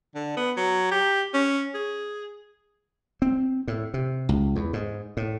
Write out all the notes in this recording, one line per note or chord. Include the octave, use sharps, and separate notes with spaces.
D3
B3
F#3
G4
C#4
G#4
C4
A2
C3
C#2
E2
G#2
A2